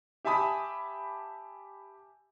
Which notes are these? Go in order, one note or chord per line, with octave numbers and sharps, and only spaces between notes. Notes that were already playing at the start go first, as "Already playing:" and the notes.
G4 E5 G#5 A5 B5 D#6